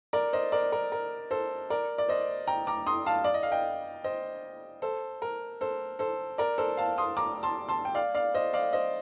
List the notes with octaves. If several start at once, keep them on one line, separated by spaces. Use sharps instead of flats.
A#4 D5
C5 D#5
A#4 D5
A#4
A#4
A4 C5
A#4 D5
D5
C5 D#5
G5 A#5
A#5 D6
C6 D#6
F5 A5
D5
D#5
F5
D#5 G5
C5 D#5
A4 C5
A#4
A4 C5
A4 C5
A#4 D5
A4 C5
F5 A5
C6 D#6
A#5 D6
A5 C6
A5 C6
G5
D5 F5
D5 F5
C5 D#5
D5 F5
C5 D#5